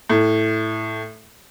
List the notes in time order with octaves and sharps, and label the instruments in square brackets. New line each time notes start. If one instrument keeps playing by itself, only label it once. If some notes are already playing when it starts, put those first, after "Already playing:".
[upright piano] A2